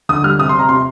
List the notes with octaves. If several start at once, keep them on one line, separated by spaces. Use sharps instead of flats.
D3 D#6
G3 F6
C3 D#6
C6
C3
A#5
C3 C6